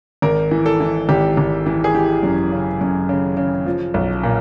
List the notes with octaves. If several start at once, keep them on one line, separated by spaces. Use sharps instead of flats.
G#1 A#4
E3
A4
E3
G#1 G4
G#1
E3
G#4
E3 G4
F#2
C#3
F#2
C#3
C#3
F3
B1
A#2